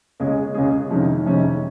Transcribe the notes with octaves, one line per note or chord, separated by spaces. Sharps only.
C#2 C#3 G#3 C#4 G#4
C#2 C#3 G#3 C#4 G#4
F2 C3 D#3 G#3 C#4
F2 C3 D#3 G#3 C#4